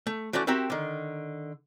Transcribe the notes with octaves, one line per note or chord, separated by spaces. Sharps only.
A3
E3 A3 C#4 F#4 D5
C4 F#4 G4 A#4 E5
D3 D#3